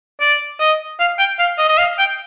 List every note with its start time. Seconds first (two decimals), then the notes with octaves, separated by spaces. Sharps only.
0.21 D5
0.60 D#5
0.99 F5
1.19 G5
1.39 F5
1.58 D#5
1.69 D#5
1.78 F5
1.99 G5